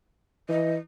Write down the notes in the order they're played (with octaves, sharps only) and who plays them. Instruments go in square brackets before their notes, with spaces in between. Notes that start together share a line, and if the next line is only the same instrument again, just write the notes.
[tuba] E3 [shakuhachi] D#5